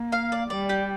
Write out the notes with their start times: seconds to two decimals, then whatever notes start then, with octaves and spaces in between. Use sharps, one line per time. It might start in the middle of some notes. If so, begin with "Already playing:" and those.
Already playing: A#3
0.12 F5
0.32 D5
0.50 G3 D5
0.69 G4